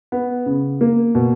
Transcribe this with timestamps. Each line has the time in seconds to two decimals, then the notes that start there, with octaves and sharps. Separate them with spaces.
0.12 B3
0.46 C#3
0.81 A#3
1.15 B2